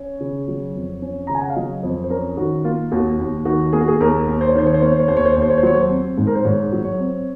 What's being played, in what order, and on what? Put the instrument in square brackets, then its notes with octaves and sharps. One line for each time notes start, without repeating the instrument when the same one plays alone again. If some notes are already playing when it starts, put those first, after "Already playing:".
Already playing: [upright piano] C#4 C#5
C#3
F#3
F2
C#4
C#3 A#5
G#5
F#5
F5
F#3 D#5
F2 C5
C5
C#4 A#4
D#3 F#4
A#3 F4
D#2 F#4
D#2
D#3 F#4
A#3 G#4
F#4
G#4
D#2 A#4
D#2
C5
C#5
D#3 C5
C#5
C5
A#3 C#5
C5
C#5
D#2 C5
C#5
C5
D#2 C#5
C5
C#5
C5
F#3 C#5
C5
C4
G#2
A#4
C5
G#2 C#5
F#3
C#5
C4